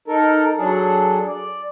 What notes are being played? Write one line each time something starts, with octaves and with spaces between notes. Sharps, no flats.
D#4 A4 A#4
F#3 D4 G#4 A4
D5